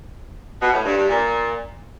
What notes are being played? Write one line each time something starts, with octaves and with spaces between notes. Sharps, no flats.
B2
A2
G2
G2
A#2